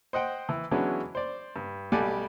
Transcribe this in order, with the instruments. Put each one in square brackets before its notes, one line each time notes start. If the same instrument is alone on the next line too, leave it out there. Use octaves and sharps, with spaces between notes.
[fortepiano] C5 D#5 F#5 G5
E3
E3 F#3 G#3 B3 C#4 D4
C5 D5
G2
B1 G3 A3 D5 F#5 G#5